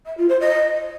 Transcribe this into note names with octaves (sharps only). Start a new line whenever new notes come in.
E5
F4
C5
D#5